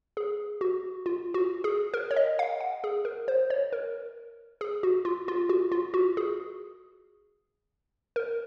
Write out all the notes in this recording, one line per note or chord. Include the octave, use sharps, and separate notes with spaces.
G#4
F#4
F4
F#4
G#4
A#4
C#5
D#5
F5
F#5
G#4
A#4
C5
C#5
A#4
G#4
F#4
F4
F4
F#4
F4
F#4
G#4
A#4